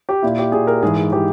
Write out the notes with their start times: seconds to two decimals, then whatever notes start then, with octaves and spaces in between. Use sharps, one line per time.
0.09 G4
0.22 A#2 E4
0.38 G4
0.52 A#2 G#4
0.67 A#4
0.83 G#2 E3 G#4
0.97 G#4
1.12 E3 G4